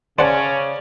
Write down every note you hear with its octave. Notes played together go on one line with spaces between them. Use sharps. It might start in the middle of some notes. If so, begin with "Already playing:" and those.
C#3 C#4 C5 D5 F#5 A5